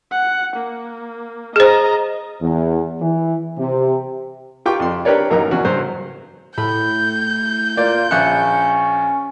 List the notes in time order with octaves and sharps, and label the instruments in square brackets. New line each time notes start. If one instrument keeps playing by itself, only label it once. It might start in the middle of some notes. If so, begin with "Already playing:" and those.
[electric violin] F#5
A#3
[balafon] G#4 C5 [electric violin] D#5 A#5
[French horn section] E2
E3
C3
[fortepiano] F4 G4 G5 C#6 D6
F2 C6
D4 G4 A#4 B4 C#5 D5
A1 F#2 A#3 D#4 A#5
E2 C#4 F#4
G2 F#3 C5
[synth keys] A2 [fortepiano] B5 [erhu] G6
[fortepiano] A#3 D5 [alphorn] F4
[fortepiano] A#1 E5 F#6 [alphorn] C#4 [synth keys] C#7